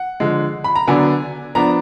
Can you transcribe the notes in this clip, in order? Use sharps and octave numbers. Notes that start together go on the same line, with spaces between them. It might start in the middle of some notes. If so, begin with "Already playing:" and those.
Already playing: F#5
D3 F3 G#3
B5
A#5
D3 F#3 B3 D4 G#5
F3 B3 D4 A#5